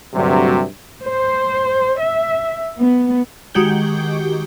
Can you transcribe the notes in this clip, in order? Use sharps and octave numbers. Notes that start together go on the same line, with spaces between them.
D2 G2 C3 F#3
C5
E5
B3
D#3 G#3 F#4 G4 G6 G7